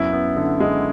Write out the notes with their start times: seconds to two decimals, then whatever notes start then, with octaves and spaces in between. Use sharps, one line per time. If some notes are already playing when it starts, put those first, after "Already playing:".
Already playing: F#2 B3 E4
0.13 B3
0.37 D3
0.60 G#3